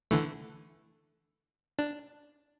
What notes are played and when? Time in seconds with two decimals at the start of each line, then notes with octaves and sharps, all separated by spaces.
0.11 D3 E3 A3
1.79 D4